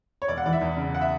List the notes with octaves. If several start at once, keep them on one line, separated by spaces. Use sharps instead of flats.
C#5
E1 D5
F#5
E3 D5
E5
E2
C#3
F#5
E5